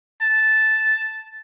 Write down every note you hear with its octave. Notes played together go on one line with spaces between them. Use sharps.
A5